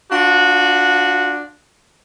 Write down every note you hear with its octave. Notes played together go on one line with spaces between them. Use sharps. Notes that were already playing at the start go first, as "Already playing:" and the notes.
D4 F4 F#4